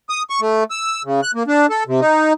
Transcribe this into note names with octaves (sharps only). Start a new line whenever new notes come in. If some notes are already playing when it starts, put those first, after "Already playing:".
D#6
C#6
A3
E6
C#3
F#6
A#3
D4
A4
C3
D#4